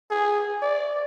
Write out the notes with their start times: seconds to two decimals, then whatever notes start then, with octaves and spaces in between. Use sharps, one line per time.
0.10 G#4
0.62 D5